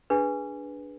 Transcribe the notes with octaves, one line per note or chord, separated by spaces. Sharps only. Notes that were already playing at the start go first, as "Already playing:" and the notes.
D4 G#4 B4